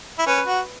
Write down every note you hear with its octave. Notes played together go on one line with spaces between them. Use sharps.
E4
C#4 B4
F#4